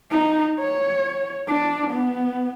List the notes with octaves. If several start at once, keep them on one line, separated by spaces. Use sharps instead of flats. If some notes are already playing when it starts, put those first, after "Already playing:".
D#4
C#5
D4
B3